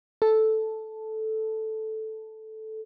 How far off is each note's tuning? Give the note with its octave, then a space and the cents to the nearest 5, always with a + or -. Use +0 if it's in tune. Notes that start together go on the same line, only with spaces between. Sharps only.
A4 -5